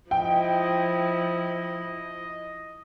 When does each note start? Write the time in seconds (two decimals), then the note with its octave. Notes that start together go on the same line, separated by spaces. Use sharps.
0.11 F3 E4 D#5 G5